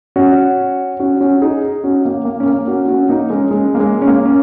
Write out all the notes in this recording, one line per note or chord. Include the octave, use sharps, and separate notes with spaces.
C#4 F#4
C#4 F#4
C#4 F#4
D#4 G#4
C#4 F#4
A#3
A#3
C#4
A#3
C#4 F#4
C#4 F#4
A#3 D#4
G#3 C#4
G#3 C#4
A#3
G#3
C#4
A#3
C#4